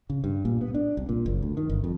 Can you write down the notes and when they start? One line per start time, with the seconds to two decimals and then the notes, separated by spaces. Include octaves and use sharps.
0.10 C#3
0.24 G2
0.45 A#2
0.61 B3
0.74 D4
0.97 C2
1.09 A#2
1.26 F#1
1.43 D2
1.57 D#3
1.70 G1
1.84 F2